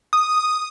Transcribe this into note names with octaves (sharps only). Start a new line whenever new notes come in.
D#6